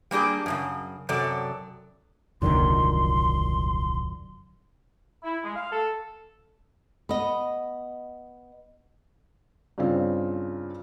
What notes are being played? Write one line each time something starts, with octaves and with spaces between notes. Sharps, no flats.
G3 A#3 D4 G4 G#4
F#2 A2 C#3
F#2 C3 F#3 A4 D5
D#1 C2 F#2 D3 D#3 C6
E4
G#3
F5
A4
B3 D#5
G2 C#3 C4 F4